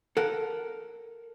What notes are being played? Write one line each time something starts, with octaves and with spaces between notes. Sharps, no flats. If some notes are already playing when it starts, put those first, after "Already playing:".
A4 A#4 F#5